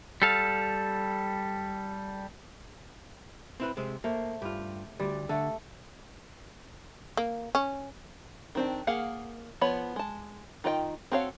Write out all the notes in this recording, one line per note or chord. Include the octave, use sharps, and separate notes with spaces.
G3 A4 F5
C4 E4 B4
C3 G#3 C4
A3 A#3 C5
G2 F4 G4
D2 G3 D5
D3 A3 A4
A#3
C#4
D#3 C4 D4
A#3 G#4 F5 F#5
F3 B3 C#5 B5
G#3 A5
D#3 F4 D#5 G5
C4 F#4 A4 C#5 F5